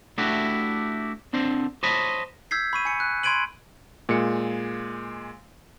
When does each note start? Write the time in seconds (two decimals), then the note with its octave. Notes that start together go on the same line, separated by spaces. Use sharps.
0.18 A3 D4 E4 F#4 G4
1.33 D3 C4 D4 C5
1.83 C5 C#5 D#5 A5 B5
2.51 E6 G6 G#6 B6 C7
2.73 B5 C#6 D#7
2.85 G#5 C#7
3.00 F#6
3.23 B5 C6 G#6 D7 D#7 F#7
4.09 A#2 G#3 C#7